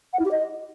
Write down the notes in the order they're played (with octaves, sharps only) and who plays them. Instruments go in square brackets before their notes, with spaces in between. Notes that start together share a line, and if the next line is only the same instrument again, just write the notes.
[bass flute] F#5
E4
G4
D#5